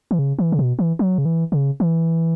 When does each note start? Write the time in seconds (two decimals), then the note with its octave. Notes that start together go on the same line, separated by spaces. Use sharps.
0.11 E3
0.19 C#3
0.39 E3
0.52 C#3
0.59 B2
0.79 E3
0.99 F#3
1.18 C#3
1.25 E3
1.52 C#3
1.80 E3